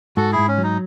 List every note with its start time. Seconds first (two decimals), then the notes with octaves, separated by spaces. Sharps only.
0.17 G#2 F#4 A4
0.32 E4 G#4
0.38 G#2
0.48 C#4
0.59 F#3
0.64 D#4